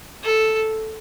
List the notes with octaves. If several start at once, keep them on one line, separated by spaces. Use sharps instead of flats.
A4